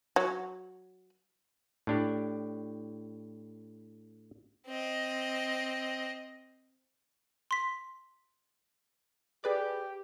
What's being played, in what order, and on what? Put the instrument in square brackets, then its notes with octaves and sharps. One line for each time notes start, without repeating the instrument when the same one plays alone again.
[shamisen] F#3
[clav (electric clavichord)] A2 D4 G4
[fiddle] C4 D#5
[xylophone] C6 B6
[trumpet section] G4 [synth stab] G#4 B4 D5